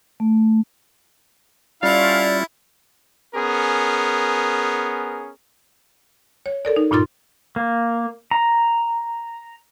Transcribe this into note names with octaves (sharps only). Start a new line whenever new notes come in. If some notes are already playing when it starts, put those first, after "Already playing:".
A3
G3 C#4 E4 F4 A4 D5 F5
B3 C#4 G#4 A#4
C#5
A4 A#4 D5
D#4
G2 A#2 D#4 F4 C6 A6
A#3
A#5